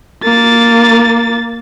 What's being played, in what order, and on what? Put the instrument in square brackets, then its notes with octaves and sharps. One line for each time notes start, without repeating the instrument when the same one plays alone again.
[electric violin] A#3 A6